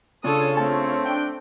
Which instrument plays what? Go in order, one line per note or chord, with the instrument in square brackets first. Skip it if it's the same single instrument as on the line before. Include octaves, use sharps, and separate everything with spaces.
[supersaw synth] C#3 F4 C#5 [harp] D4 [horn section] A4 [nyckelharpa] D#6
[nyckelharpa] A3 C4 [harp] A5
[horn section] D4 G5